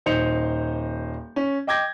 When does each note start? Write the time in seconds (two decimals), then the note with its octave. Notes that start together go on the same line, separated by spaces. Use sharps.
0.06 D#1 D#4 C5 G6 C#7 F7
1.36 C#4
1.67 D#5 G5 D6 G6 G#6 A#6